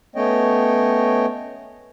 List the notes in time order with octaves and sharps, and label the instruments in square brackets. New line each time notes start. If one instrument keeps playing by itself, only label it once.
[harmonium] A3 B3 C#4 C#5 D#5 G5